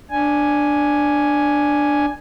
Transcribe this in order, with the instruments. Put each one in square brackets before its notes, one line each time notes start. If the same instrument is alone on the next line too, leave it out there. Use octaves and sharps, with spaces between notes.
[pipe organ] D4 G#5